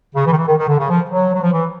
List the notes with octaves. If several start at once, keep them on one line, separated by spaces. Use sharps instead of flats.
C#3
E3
D#3
E3
D#3
D#3
D3
C#3
F3
F#3
F#3
F3
E3